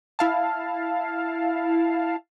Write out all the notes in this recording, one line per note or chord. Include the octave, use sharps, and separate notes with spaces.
E4 F5 A5